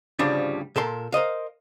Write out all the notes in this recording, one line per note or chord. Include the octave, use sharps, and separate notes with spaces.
D2 G#2 C#3 F3 G3 D4
A#2 A4 A#4 C6
A#4 C5 D#5 F5